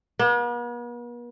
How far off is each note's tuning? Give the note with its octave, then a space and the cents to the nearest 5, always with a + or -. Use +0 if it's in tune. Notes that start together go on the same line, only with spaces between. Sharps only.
B3 -45